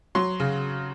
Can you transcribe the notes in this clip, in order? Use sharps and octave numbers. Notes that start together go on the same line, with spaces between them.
F#3 C6
C#3